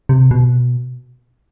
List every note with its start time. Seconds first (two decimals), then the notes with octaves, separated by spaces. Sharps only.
0.09 C3
0.31 B2